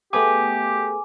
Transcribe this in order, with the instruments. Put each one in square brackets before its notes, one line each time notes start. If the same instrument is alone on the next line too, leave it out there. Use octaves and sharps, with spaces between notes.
[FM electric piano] A3 B3 G#4 [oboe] G4 [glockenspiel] G#5 D6